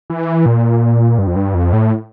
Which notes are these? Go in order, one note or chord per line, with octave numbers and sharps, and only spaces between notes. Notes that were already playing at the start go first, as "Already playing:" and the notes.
E3
A#2
G2
F2
G2
F2
A2